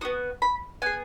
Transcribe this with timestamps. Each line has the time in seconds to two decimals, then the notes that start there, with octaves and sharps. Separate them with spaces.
0.01 D#4 F#4 D#6
0.05 B3
0.42 B5
0.82 B3 G#4 G#5